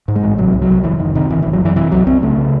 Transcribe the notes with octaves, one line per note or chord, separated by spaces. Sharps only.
G#2
G#3
A1
C3 F#3
C2
F#3
C2
F#1 E3
F#1 D#3
C3 D#3
G#1 E3
E3
G#1
F#3
F#2 E3
C3 E3
C2 F#3
C2 C4
C#3 A3
C#3